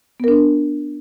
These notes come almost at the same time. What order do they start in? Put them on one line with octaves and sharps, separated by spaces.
B3 A#4 D4